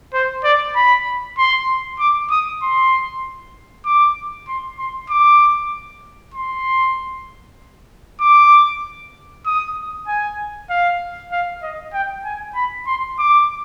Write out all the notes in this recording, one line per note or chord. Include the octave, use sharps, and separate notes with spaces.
C5
D5
B5
C6
D6
D#6
C6
D6
C6
C6
D6
C6
D6
D#6
G#5
F5
F5
D#5
G5
G#5
B5
C6
D6